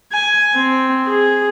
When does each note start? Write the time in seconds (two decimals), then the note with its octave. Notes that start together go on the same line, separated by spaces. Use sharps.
0.12 G#5
0.55 C4
1.06 G#4